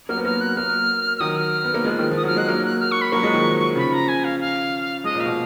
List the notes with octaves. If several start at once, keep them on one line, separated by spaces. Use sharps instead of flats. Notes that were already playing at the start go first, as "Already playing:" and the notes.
F#3 A#3 F6
B3
F#3 A#3 F6
F#6
F#3 A#3 F6
F6
D#3 F#3 D#6
F6
B3
A#3
F3 G#3
D#3
F3 D#6
F#3 F6
G#3 F#6
F#3 A#3 F6
F#6
F6
C#6
B5
F#3 A#3 C#6
F3 G#3
D#3 F#3
C#3 F3 B5
A#5
G#5
F5
F5
F3 G#3 D#5
A#2
F5
B2